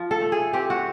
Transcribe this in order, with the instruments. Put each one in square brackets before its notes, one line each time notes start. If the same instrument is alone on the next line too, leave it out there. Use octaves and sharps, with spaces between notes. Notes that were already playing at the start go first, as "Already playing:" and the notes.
Already playing: [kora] F3
A4
A3
G#4
C4 G4
F#4